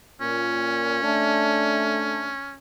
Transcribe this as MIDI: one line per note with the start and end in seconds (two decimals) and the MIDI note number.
0.21 1.02 46
0.21 2.58 61
1.02 2.34 57
1.02 2.34 62